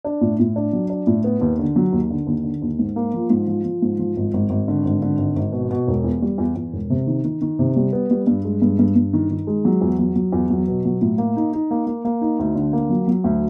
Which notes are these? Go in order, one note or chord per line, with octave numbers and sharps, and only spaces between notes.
D4
A2
A2
D4
F#3
D4
A2
B3
D#2
D3
F#3
D#2
D3
D#2
D3
D#2
G#2
A#3
F3
G#2
F3
F3
G#2
F3
G#1
G#1
G#1
D3
G#1
D3
G#1
G#1
B2
B2
E1
E2
G3
E2
E2
E1
C3
D#3
D#3
D#3
C3
G3
B3
G3
G2
G#3
G2
G2
G2
D#3
D#3
G#3
F#3
E2
F#3
F#3
E2
F#3
B2
F#3
A2
A#3
D#4
D#4
A#3
A#3
A#3
D#4
D2
D3
A#3
F#3
F#3
D2